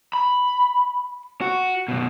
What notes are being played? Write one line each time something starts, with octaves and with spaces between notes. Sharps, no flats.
B5
F#4
F#2 B2